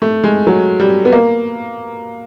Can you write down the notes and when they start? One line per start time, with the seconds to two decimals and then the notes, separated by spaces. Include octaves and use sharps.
0.02 A3
0.24 G#3
0.47 F#3
0.80 G3
1.05 B3
1.12 A#3